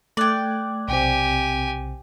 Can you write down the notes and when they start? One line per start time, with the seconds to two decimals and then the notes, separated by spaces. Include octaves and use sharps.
0.17 A3 D5 G5 F#6 G#6
0.88 B1 C3 C4 G4 G#5